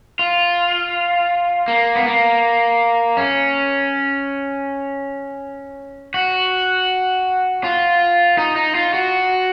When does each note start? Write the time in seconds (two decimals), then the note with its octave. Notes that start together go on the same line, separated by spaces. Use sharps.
0.19 F4
1.68 A#3
1.96 B3
2.06 A#3
3.17 C#4
6.14 F#4
7.64 F4
8.38 D#4
8.56 D#4
8.75 F4
8.94 F#4